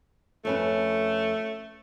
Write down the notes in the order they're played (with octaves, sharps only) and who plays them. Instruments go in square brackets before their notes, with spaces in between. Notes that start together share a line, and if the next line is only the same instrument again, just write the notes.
[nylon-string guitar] F2 C#4 B4 [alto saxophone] A3